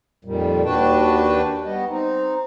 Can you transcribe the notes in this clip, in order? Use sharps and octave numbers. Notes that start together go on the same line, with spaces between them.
F2 A#2 D#3 G3
D#2 D4 F#4 B4 G5 A5
G3 B3 D#5
C4 D#4